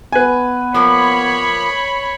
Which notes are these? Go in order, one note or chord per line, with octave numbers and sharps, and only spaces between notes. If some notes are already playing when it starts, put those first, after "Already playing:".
B3 B4 G#5
F3 A#3 C#5 B5